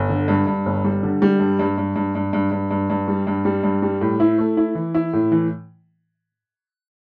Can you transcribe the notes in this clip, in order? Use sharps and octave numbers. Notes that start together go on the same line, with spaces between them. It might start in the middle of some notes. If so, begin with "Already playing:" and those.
Already playing: G1
D3
G2
G2
G1
G3
D3
G3
G2
G2
G2
G2
G2
G2
G2
G2
G2
G3
G2
G3
G2
G3
A2
E4
A3
E4
E3
E4
A2
E3